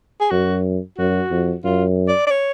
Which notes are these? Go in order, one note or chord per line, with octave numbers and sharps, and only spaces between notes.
G#4
F#2 F#4
F#2 F#4
F2
F#2 F4
D5
D5
C#5